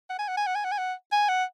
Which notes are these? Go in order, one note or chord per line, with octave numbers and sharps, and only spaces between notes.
F#5
G#5
F#5
G#5
F#5
G#5
F#5
G#5
F#5
G#5
F#5